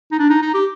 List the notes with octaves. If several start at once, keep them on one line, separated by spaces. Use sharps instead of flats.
D#4
D4
D#4
D#4
G4